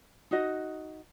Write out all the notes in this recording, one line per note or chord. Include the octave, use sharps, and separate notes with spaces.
D#4 F#4 D#5